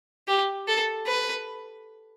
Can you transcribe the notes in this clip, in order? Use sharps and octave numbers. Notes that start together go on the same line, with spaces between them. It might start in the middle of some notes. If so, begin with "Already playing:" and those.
G4
A4
B4